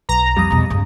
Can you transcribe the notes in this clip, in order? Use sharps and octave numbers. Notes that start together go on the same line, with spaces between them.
B1 A#5
F2 G3 D#6
E2 B2
G2 C#3